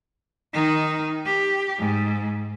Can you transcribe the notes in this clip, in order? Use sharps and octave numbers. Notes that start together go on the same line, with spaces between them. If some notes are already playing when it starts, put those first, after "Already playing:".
D#3 D#4
G4
G#2